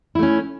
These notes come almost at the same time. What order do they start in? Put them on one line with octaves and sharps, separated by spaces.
E4 A3 C#4